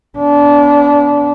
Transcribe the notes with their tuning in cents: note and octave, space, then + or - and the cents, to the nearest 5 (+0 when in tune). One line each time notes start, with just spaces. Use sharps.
B3 +0 D4 -25